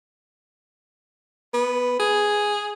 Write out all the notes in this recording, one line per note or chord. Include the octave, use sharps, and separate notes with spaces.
B3
G#4